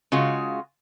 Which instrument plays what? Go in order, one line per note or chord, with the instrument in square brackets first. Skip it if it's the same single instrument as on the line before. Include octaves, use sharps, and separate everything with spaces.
[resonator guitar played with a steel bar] C#3 G#3 F4 F#4